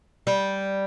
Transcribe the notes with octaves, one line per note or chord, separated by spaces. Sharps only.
G3